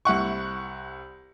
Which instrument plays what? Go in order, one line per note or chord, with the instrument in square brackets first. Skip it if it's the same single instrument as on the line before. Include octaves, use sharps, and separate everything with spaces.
[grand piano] C2 E4 F#5 C#6